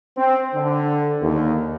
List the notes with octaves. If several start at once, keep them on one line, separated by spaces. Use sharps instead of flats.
C4
D3
D#2